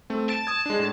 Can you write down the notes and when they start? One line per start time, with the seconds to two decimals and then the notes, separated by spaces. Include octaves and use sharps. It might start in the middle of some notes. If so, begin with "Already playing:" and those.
0.10 A3 C4
0.29 A5 A6 D7
0.47 D#6 G#6
0.66 G#3 D4
0.79 A2